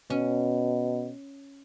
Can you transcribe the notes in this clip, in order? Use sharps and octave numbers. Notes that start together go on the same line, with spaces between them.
B2 C#4